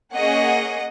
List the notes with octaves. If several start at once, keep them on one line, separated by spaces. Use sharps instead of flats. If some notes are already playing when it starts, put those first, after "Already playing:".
A#3 C#4 G#4 D#5 F#5